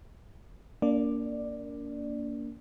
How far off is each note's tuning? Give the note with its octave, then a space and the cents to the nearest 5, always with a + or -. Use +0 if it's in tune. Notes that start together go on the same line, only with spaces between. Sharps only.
A#3 +0 D4 -35 D5 +10